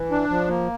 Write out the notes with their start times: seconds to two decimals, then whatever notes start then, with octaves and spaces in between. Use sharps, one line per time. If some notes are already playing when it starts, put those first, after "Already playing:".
Already playing: E3
0.11 D4
0.30 F3
0.48 A#3